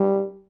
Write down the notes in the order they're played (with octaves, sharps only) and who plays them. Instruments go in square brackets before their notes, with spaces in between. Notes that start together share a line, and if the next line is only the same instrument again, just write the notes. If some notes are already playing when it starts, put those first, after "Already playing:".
Already playing: [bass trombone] G3